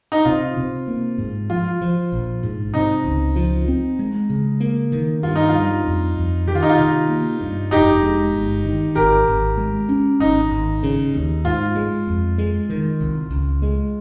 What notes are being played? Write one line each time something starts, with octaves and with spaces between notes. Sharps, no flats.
D#4
C3 F4
C3
A#3
G#2
F3 F4
F3
A#1
G#2
C3 D#4
C#2
F3
C4
G#3
C#3
A#3
D#3
G2 F4
D#4
F4
G3
F2
F2
D#3 G4
F4
D#4
F4
C3
A#3
G2
F1 D#4 G4
G#3
G1
D#3
G#1 G4 A#4
G#1
G#3
C#4
G#1 D#4
G#1
C#3
D#2
G#2 F4
G#3
F2
G#3
D#3
C2
C#2
G#3